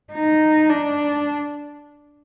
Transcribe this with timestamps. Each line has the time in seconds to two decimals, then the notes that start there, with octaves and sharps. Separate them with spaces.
0.13 D#4
0.70 D4